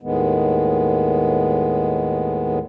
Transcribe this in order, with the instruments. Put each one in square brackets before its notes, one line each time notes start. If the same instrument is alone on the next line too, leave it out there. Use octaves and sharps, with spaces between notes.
[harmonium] D#2 A2 D#3 G#3 B3